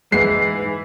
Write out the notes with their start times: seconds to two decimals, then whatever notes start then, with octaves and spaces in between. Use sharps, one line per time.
0.12 G#2 E3 G#3 C7